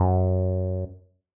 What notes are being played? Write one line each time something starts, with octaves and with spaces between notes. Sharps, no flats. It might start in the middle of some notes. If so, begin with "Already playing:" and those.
Already playing: F#2